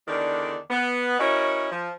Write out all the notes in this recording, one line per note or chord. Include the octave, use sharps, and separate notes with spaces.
E2 D3 D#3 D4 D5
B3
C#4 E4 F#4 A#4 C#5 D#5
F3